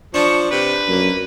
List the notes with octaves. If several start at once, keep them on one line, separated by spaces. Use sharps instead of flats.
F3 D4 C#6
C3 B4
F#2 A#3